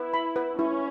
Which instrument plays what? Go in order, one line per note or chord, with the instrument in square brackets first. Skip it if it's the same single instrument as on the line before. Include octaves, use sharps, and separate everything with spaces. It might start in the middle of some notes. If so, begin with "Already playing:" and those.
Already playing: [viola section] E4 [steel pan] B4
[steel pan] B5
B4
[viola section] C#4 [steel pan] E4